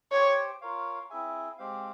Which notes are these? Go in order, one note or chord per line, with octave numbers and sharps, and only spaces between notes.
G4 C5 C#5 G5
F4 A#4 C#5 F5
C4 E4 G#4 E5 G#5
G#3 C4 G4 C5 F5